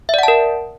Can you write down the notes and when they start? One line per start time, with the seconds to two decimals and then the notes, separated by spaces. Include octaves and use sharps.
0.09 E5
0.14 D5
0.19 F#5
0.23 A5
0.28 A#4